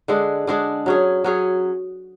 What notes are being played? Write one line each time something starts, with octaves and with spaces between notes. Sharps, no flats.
D3 G#3 D4 G#4
D3 G#3 D4 G#4
F#3 C#4 G#4
F#3 C#4 G#4